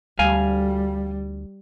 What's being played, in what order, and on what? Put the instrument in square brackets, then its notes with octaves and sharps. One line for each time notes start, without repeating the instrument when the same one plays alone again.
[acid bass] D2 [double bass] G3 [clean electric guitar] F5 G#5